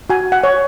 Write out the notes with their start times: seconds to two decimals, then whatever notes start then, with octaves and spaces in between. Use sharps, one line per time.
0.10 F#4 G#5
0.32 F#5
0.44 C#5